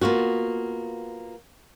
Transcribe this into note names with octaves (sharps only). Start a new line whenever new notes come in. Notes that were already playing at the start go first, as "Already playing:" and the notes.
A#3 B3 F4 F#4